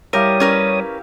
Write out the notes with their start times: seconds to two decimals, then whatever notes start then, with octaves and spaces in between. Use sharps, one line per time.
0.13 G3 E4 G4 A#4 C#5 F5 D#6
0.40 C#4 A#4 B4